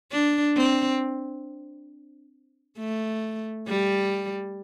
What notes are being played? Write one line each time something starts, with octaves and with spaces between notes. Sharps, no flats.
D4
C4
A3
G3